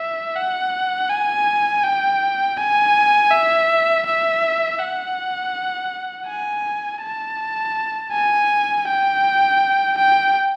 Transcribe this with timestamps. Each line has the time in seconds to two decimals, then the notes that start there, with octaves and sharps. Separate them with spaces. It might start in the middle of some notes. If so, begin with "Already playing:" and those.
Already playing: E5
0.36 F#5
1.09 G#5
1.84 G5
2.57 G#5
3.31 E5
4.06 E5
4.80 F#5
6.27 G#5
7.02 A5
8.12 G#5
8.87 G5
9.98 G5